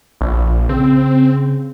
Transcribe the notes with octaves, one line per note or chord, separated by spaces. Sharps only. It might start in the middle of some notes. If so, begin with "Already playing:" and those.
A#1
C#3 C4